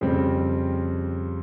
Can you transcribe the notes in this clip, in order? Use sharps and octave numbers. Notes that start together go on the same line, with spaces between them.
F2 C#3 G3 C4